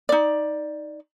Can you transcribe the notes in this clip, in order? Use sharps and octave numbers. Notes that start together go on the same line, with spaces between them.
D#4 D5